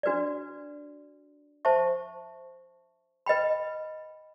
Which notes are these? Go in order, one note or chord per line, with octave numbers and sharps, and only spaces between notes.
D4 F#4 B4 D5
C5 E5 A5 C#6
B4 D#5 G5 B5